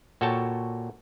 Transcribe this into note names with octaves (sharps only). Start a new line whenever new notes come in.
A#2 F#4 A4 C#5 G5 A5